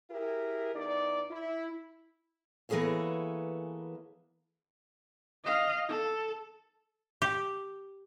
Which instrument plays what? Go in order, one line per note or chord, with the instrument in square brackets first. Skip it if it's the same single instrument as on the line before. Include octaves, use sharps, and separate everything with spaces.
[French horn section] E4 G4 G#4 A#4
E2 D#4 D5
E4
[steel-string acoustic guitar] E3 A#3 B3 G#4 A4 C#5
[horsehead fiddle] D#5 F5
A4
[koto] G4